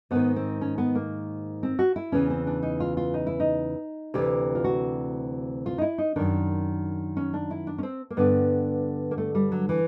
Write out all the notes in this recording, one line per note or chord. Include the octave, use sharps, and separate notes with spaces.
G#2 D#3 B3
C4
C#4
B3
A#3
C4
F#4
E4
E2 C#3 E3 C#4
C4
D4
D#4
F4
F4
D#4
E4
D#4
D2 C3 E3 G4
F4
F#4
F4
D#4
E4
D#4
F#2 D#3 D4
C#4
D4
E4
D4
C#4
C4
A#3
G2 D3 B3
A#3
A3
G3
F#3
E3